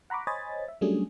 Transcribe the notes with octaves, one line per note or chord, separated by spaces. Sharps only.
F#5 A#5 B5 C#6 D6
C5 C#5 D#5 G#5 B5 A6
E5
F#3 G3 A3 C#4 D4 G#4